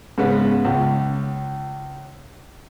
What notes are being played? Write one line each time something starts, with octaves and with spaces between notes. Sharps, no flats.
G#2 C#3 B3
C#2